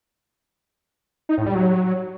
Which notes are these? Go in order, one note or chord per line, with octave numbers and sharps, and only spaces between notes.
D#4
A2
G3
F#3